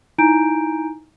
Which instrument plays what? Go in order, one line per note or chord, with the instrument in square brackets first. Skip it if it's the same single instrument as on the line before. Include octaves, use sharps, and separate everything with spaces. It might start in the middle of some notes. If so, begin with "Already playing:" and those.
[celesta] D#4 E4 G#5 A#5 G6 D7